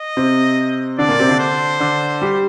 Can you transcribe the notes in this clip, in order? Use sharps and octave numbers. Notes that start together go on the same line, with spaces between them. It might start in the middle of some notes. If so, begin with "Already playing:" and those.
Already playing: D#5
C3 C4
D3 D4 D5
A#2 A#3
C3 C4
D3 D4
C5
D3 D4
G3 G4